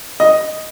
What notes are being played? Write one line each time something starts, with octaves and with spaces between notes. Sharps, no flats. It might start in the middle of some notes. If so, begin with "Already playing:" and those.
D#5